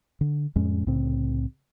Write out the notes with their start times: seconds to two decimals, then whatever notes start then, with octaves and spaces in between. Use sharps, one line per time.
0.21 D3
0.56 F2 A2 G#3 C#4
0.86 C2 A2 C#3 C4